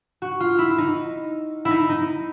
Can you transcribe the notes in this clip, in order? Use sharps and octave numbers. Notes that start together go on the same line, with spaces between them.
F#4
F4
E4
D#4
E4
D#4
D#4